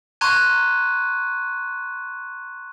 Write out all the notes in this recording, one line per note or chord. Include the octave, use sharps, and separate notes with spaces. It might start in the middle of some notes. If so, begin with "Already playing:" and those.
A#5 C6 C#6 F#6 G#6 D#7